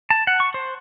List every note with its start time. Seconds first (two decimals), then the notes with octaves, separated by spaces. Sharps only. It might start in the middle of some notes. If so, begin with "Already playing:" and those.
0.10 A5
0.27 F#5
0.40 C#6
0.54 C5